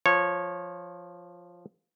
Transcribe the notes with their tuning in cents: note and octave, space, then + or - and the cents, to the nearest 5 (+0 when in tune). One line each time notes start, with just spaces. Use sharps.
F3 +0 C#5 -15